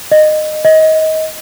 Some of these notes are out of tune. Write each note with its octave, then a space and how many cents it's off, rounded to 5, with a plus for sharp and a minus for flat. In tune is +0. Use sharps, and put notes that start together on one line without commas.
D#5 -20
D#5 +25